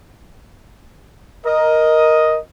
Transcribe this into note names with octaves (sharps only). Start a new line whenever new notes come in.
A#4 D#5